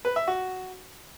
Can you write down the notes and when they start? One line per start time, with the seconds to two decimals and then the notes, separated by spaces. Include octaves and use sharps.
0.05 B4
0.16 E5
0.28 F#4